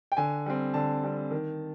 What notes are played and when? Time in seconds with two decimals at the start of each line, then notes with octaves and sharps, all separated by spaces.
0.12 G5
0.17 D3 G#5
0.46 G3 C4
0.74 D3 A5
1.03 G3 C4
1.31 D#3